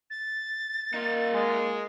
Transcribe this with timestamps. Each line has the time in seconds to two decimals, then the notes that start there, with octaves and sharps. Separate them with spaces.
0.10 A6
0.94 A#3 D#4 F4
1.33 G#3